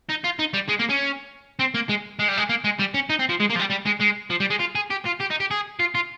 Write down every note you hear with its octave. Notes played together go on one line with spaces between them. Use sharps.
D#4
F4
D#4
G3
G#3
A#3
C#4
C4
A#3
G#3
G#3
G3
G#3
A#3
G#3
G3
C#4
D#4
C4
F3
G#3
A#3
F3
G3
G3
G#3
G#3
F3
G3
G#3
F4
G#4
G4
F4
G4
D#4
G4
G#4
F4
F4